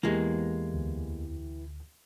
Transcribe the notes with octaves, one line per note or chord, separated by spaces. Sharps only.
E2 E3 G#3 A#3 B3 G4
D2